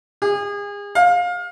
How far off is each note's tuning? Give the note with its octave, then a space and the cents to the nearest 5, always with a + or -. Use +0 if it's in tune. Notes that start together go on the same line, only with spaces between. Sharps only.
G#4 -35
F5 +20